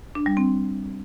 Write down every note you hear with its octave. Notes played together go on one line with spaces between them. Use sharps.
D4
G3
C4